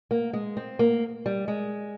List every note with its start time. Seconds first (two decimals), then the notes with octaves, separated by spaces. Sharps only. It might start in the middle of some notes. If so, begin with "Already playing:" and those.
0.11 A#3
0.33 G#3
0.57 C4
0.79 A#3
1.26 G3
1.48 G#3